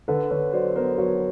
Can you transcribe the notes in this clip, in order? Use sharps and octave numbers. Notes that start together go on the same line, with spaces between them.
D3 A4 B4
D3 B4 C#5
F#3 C5 D5
B3 A#4 C5
F#3 B4 C#5